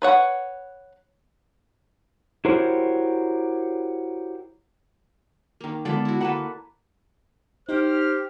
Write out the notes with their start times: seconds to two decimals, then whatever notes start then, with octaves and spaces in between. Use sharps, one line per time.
0.02 B4 C#5 F#5
2.45 E4 F#4 G4 A#4 C5 C#5
5.61 D#3 A#3
5.85 D3 G#3 B3 F4 A4 D5
6.05 E4 F#4
6.21 D2 A#3 A4 B4 F#5
7.69 D#4 G4 C5 F6